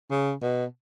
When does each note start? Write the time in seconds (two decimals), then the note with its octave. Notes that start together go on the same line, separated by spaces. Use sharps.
0.11 C#3
0.42 B2